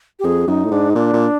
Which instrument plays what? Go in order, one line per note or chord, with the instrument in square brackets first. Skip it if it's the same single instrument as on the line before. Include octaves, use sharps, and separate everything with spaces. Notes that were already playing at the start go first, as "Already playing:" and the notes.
[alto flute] G4
[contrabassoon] F2 [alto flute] G#4
[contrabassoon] F#2 [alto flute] D#4
[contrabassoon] A2
[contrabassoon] G#2 [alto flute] D4
[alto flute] D#4
[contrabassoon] A#2 [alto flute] D4
[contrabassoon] A#2